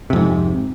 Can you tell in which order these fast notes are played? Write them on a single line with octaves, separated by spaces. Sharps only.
C3 F2 G#2